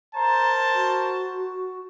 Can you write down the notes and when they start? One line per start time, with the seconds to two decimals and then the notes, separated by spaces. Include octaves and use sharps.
0.15 A#4 C5 A5 A#5
0.74 F#4